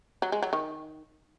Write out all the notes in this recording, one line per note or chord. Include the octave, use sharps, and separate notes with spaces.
F#3
G#3
F#3
D#3